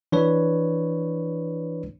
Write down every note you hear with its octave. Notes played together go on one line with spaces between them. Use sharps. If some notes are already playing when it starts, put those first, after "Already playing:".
E3 D4 B4 C#5